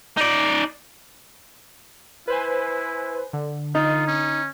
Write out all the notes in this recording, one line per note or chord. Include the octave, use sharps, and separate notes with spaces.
D#4 D5
E4 B4 C5 G#5
D3
D#4 F4
C#4